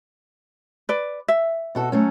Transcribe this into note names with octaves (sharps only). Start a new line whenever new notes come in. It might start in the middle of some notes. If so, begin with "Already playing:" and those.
B4 D5
E5
B2 F#4 A4
F#3 A3 C#4